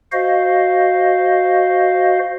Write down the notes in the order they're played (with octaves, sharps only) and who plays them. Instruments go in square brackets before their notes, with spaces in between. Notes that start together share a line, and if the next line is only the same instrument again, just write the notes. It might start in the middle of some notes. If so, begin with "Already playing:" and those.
[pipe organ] F#4 C5 D#5 F5